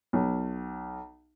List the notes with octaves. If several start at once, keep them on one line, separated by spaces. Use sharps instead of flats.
B1